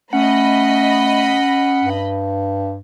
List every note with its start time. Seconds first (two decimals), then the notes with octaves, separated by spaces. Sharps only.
0.13 A3 C#4 D#5 F#5 B5
1.84 G2